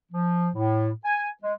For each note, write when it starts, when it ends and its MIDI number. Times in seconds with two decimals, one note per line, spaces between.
0.12 0.48 53
0.55 0.90 45
1.05 1.28 80
1.43 1.53 56